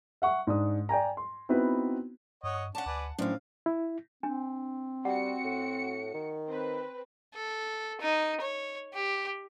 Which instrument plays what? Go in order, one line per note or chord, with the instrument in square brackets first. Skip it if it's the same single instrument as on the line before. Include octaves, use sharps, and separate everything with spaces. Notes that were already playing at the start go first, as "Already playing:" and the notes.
[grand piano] E5 F#5 C#6
G#2 D4 D#6
D5 G5 G#5 A#5
C6
B3 C4 D#4 E4 F#4 B4
[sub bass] G2 [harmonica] C#5 D#5 F#5
[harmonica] C#4 D4 [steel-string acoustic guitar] F#5 A5
[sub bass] D2 [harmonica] B4 D5 G#5
[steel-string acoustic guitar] A2 E3 [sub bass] F#3 [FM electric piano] C#4 D4 C5 [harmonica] F5
[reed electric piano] E4
[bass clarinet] C4 [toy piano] D4
[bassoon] G3 [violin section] F#4 C#7 [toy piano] F#5
[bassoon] A2
D#3
[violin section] C4 B4
[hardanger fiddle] A4
D#4
C#5
G4